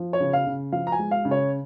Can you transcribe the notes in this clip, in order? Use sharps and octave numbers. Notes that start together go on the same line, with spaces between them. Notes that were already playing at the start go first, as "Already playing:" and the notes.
Already playing: F3
C#5
C#3
F5
C#3
F3 F5
A#5
G#5
G#3
F5
C#3
C#5